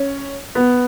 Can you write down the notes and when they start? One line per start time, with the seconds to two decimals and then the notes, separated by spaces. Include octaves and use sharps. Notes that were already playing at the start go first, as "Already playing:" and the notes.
Already playing: C#4
0.55 B3